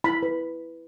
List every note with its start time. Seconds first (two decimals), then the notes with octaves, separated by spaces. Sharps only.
0.04 E4 B5
0.23 B4